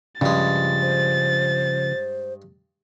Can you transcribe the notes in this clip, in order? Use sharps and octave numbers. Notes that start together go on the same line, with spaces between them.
G2 C#3 F3 G#3 A6
C5